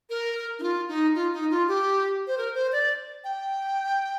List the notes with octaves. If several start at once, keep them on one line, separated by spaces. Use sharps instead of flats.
A#4
D#4
F4
D#4
F4
D#4
F4
G4
C5
A#4
C5
D5
G5